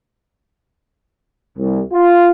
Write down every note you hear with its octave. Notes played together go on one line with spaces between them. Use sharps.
C2
F4